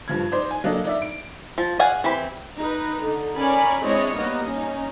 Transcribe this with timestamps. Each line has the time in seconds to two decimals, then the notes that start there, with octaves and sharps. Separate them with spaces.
0.08 G2 F3 G#6
0.32 D#4 C5 D5
0.51 G#5
0.64 F#3 A#3 D4 A4 D#5
0.85 D#4 D5 E5
1.02 D7
1.58 F3
1.79 G#4 D5 F5 F#5 G#5
2.04 E3 C4 G4 B5
2.59 D#4 B4
3.02 D3 D#4
3.37 C#4 A#4 D5 G#5 B5
3.84 G#3 C4 D4 E4 C#5 D#5
4.18 G3 A#3 B3 D#4 D#5
4.49 C#4 D#4